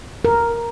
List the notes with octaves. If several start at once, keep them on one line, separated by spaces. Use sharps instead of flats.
A#4